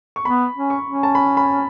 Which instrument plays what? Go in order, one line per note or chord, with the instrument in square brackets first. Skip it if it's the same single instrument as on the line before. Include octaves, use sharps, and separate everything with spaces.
[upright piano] C#6
[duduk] B3 [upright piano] B5
[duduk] C#4
[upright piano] C#6
[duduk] C#4
[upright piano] A5
B5
B5